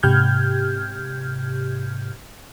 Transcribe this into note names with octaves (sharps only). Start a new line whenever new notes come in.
G#2 C3 G4 F6 G6 G#6